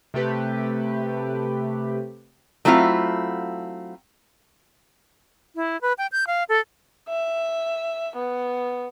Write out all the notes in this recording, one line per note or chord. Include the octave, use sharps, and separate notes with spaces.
C3 A3 G4 B4
F#3 A3 C4 E4 F4 F5
E4
B4
G5
G6
F5
A4
E5
B3